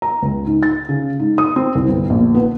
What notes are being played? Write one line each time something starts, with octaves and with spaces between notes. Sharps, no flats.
A#5
C#2
G#2
A6
C#3
G#2
D#6
C4
C2
G1
A#1
B3